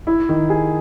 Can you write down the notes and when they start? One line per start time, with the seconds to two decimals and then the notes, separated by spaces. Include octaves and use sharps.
0.07 E4
0.29 D#3
0.50 G#4